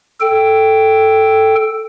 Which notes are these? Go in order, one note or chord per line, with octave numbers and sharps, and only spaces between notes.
A4 G5